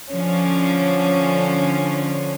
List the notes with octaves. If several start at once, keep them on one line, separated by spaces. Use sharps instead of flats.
D3 F3 C#4